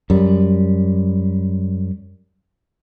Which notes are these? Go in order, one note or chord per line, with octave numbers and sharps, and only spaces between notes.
F#2 G3